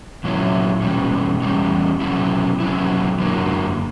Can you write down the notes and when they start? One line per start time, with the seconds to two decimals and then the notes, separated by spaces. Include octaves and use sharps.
0.24 A#2 F#3 C#4 E4
0.82 E2 B2 G3 C#4
1.42 E2 B2 G3 C#4
2.01 B2 F#3 C#4 E4
2.60 B2 F#3 C#4 E4
3.20 F#2 D3 F#3 A#3